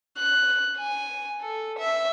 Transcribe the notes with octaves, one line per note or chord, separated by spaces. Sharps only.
F#6
G#5
A4
E5